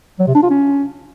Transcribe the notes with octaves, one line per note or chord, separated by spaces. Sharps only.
F#3
C3
D4
F4
C#4